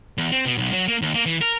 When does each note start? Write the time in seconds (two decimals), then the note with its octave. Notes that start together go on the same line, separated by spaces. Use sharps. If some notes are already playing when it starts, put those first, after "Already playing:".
0.18 E2
0.32 C4
0.45 B2
0.58 B1
0.72 F#3
0.88 A#3
1.02 D#2
1.14 A#3
1.26 E3
1.42 A#4